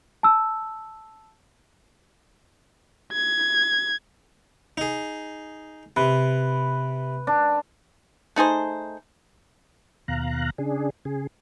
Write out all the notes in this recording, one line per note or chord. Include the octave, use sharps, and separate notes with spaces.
A5 E6
G#6
D#4 G#4
C3 B4
D4
A3 D#4 G#4 C5
D#2 B2 F5 A#5 F#6
C#3 D4 G#4
C#3 G#4